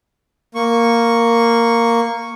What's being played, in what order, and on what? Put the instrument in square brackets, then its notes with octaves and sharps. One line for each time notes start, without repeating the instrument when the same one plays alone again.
[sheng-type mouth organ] A#3 C#6